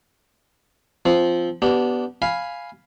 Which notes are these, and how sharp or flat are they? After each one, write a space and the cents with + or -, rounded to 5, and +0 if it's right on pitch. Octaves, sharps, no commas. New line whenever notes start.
F3 -5 C4 +0
B3 +0 D4 -10 G4 -25
F5 +0 G#5 +0 B5 +0